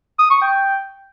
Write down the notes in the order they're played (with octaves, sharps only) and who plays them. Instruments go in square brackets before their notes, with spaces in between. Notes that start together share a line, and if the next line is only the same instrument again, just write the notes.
[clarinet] D#6
C#6
G5